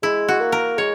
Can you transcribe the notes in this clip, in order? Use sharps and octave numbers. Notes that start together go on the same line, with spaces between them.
G#3 E4
F#4
A#3
A#4
G#3 C#5